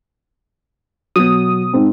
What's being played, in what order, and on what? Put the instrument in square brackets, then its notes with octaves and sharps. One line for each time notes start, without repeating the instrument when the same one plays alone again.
[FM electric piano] B2 D#6 [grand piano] F#3
[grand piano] G#2 C4